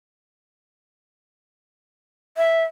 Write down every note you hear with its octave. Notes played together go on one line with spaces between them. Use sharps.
E5